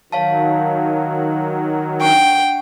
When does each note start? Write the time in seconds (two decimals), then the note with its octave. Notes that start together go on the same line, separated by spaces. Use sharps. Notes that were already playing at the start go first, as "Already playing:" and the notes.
0.12 D#3 F#3 C#5 F5 A5
2.01 D4 F#5 G5 C#6